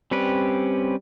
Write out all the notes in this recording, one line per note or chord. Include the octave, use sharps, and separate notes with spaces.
G3 C4 C#4 G4 B4